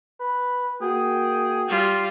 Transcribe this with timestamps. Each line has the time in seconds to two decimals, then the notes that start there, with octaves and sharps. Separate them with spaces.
0.20 B4
0.81 A#3 F#4 G#4 G5
1.68 G3 F4